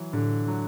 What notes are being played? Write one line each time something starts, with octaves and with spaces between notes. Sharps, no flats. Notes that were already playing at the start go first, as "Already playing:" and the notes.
Already playing: E3 F#3
A2 D3
F#3